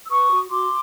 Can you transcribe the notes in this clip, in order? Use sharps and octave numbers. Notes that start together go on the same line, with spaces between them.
E6
B4 C#6 D#6
F#4
F#4 C6 D6